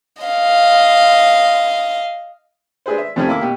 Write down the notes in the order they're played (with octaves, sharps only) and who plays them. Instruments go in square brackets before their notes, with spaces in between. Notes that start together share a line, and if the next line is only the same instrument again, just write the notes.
[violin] D#5 F5
[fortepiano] G#3 D4 G#4 B4 C5
E5
F2 C3 D#3 G3 A3 C#4
A#3 E4 D6
B2 G4